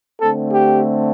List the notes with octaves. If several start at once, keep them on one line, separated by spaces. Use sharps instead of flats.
D3 A3 C4 A4
G4